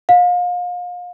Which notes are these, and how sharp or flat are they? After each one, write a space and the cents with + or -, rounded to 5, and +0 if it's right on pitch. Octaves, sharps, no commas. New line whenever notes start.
F5 +35